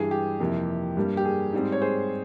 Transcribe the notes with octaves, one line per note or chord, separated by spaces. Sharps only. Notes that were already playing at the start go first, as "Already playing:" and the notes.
Already playing: G2 E3 G3 G#4
G4
F2 C3 E3 A#3
G2 G3 A#3
G4
G#4
G#2 G3 C4
C#5
G#4 C5